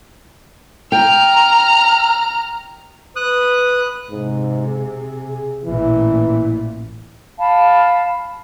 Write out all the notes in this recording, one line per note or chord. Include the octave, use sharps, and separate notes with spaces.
G5 A#5 F6
B4 D#6 F#6
G#2 C3
G#4
A1 A#2 E3
F5 A5 B5